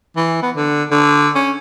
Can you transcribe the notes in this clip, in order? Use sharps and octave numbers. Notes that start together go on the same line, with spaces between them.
E3
B3
D3
D3
C#4